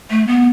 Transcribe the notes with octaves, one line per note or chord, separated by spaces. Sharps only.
A3
B3